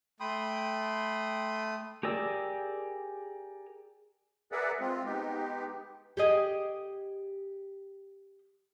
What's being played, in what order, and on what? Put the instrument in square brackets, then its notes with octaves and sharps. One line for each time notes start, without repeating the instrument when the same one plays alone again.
[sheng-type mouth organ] A3 D#6 [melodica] G5 B5 C6
[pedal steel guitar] G4 G#4 A#4 D5 E6
[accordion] G#4 A#4 B4 D5 E5 F#5
G#3 C4 F4
G#3 B3 D#4 G4
[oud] G4 G#4 D#5